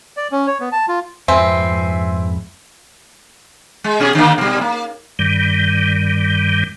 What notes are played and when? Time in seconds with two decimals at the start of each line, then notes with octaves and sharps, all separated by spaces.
0.17 D5
0.32 C#4
0.47 C#5
0.60 B3
0.72 A5
0.88 F4
1.28 F2 G#2 F3 C4 B4 E5 G#5 C6
3.84 G#3
4.00 B2 C#4 G#4
4.15 D3 D#3 A#3
4.38 B2 G3
4.61 A#3
5.19 G2 D#3 G3